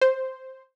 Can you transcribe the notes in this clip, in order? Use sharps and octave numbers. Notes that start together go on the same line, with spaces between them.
C5